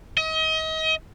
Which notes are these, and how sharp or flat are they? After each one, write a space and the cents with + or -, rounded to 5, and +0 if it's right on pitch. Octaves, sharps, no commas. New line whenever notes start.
D#5 +35